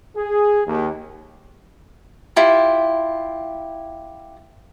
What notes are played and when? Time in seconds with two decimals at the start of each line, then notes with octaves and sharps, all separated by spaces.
0.16 G#4
0.67 D#2
2.36 E4 F4 G4